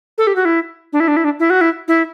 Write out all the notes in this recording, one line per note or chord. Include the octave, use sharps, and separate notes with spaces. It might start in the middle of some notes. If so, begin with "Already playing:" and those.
A4
G4
F#4
E4
D4
E4
D4
E4
D4
E4
F#4
E4
E4